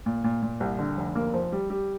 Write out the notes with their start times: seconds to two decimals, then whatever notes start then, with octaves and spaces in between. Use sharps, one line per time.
0.06 A#2
0.24 A#2
0.42 A#2
0.60 C2
0.79 D3
0.97 F1
1.15 A#3
1.34 F3
1.52 G3
1.70 G3